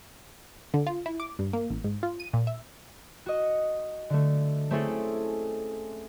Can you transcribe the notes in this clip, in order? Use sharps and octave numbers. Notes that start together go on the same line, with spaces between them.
D3
F4
E4
D6
G2
A#3
A1
G#2
F4
D#7
A#2
E5
F#4 D#5
D3 A3
A3 C4 C#4 E4 G#4 A4